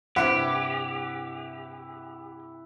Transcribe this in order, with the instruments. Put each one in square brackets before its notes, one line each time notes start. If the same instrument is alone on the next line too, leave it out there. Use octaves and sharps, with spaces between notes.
[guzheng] G2 C3 B4 [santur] E4 [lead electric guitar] G4 [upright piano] F#5